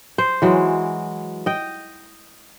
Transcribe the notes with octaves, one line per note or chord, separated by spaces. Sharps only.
C5
E3 F#3 G#3
D#5 G5